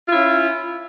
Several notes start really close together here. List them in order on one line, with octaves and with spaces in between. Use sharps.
F4 E4 C#4